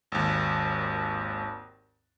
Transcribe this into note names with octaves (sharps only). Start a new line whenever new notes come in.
G#1 D#2